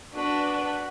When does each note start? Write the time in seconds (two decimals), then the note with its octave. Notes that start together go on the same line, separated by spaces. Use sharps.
0.13 D4 F#4 B4